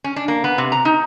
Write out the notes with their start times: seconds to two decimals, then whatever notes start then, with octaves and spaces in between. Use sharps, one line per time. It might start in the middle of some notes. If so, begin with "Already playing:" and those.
0.04 C#4
0.16 D4
0.28 A#3
0.44 B3
0.58 C3
0.72 A#5
0.85 D#4